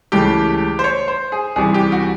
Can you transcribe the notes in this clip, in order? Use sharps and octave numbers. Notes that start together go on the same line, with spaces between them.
C#2 C#3 E3 A3 G4
C5
C#5
C5
G#4
C2 C3 E3 G#4
G4
F#4